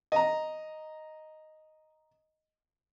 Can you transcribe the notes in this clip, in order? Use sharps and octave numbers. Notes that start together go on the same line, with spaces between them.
D#5 A#5